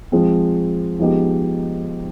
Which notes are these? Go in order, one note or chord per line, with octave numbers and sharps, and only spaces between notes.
F3 G#3 C4
F3 G#3 B3 D#4 G4